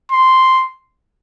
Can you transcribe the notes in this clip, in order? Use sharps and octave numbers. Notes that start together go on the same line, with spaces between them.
C6